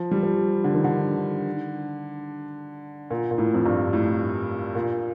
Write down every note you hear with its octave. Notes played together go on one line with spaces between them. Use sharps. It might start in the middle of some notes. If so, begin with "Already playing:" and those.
Already playing: F3
G3
F3
D3
D#3
D3
A#2
A#2
A2
F2
G2
A2
A#2